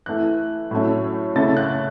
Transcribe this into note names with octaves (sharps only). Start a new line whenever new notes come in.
E3 A3 E4 F#6
A2 F#3 A3 C#4
C#3 A3 E4 A6
F#6